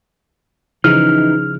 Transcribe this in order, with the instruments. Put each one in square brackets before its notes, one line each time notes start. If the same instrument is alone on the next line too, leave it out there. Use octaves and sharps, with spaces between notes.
[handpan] C#3 F3 E4 [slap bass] E3 [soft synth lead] D#4 [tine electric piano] F6